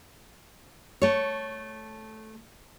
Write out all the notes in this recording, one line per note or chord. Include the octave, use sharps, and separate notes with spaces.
A3 C#5